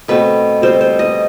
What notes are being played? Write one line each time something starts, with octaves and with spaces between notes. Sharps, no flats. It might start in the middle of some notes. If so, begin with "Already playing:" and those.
B2 A3 C4 B4
B2 G3 C4 C5
C5
D#5